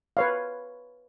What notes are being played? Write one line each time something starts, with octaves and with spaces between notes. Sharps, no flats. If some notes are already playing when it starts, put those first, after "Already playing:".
B4 C#5 F5